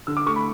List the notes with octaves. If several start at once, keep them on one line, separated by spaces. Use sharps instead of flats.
D3 E6
D6
A3 C#6
B5